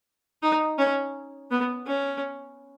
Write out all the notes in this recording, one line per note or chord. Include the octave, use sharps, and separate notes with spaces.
D#4
C#4
B3
C#4